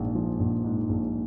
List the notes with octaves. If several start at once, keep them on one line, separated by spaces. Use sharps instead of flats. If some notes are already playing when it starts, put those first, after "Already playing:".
Already playing: A#1 G#2
F3
A#1
G#2
A#1